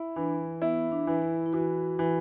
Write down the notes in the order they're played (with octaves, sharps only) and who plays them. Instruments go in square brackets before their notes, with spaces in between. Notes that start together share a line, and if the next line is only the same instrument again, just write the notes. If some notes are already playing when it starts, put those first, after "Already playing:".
Already playing: [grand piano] E4
[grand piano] E3 [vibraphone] D4
[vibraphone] B3 [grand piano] E4
[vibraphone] D4
[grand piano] E3
[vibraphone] E4
E4
[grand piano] E3 [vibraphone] F#4
[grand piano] E3